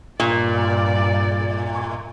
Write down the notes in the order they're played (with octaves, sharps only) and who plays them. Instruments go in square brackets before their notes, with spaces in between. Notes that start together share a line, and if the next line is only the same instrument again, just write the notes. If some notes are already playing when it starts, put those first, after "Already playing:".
[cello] G2 D5 [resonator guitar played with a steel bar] A#2